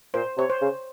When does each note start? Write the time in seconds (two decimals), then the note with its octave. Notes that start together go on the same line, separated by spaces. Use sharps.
0.14 A#2 C5
0.37 C3 C#5
0.50 C5
0.61 C#3